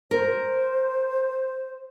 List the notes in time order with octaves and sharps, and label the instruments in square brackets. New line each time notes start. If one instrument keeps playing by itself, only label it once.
[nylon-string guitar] A#4 [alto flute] C5